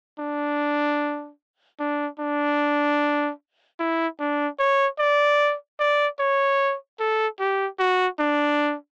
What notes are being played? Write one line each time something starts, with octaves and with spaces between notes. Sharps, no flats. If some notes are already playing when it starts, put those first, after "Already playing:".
D4
D4
D4
E4
D4
C#5
D5
D5
C#5
A4
G4
F#4
D4